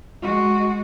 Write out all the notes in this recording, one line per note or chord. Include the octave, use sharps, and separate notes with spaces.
G#3 F#4